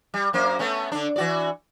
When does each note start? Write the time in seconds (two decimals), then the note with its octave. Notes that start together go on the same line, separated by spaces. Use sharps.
0.14 G3
0.33 F#2 A#3 C5
0.59 A3 B3 C#4
0.92 D3 D4
1.16 E3 F#4 D5